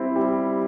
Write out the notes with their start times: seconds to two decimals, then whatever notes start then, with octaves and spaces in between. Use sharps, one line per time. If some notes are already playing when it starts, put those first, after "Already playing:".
Already playing: G3 C4 E4
0.16 G3